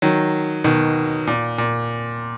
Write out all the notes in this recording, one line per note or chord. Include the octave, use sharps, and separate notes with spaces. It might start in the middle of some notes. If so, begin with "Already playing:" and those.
D#3 F#3
B2 D#3
A#2
A#2